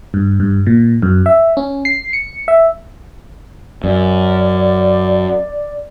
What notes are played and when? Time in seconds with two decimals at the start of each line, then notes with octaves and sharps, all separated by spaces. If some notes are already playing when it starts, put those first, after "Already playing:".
0.14 G2
0.40 G2
0.67 A#2
1.02 F#2
1.26 E5
1.57 C#4
1.85 C7
2.13 C#7
2.48 E5
3.84 F#2 D5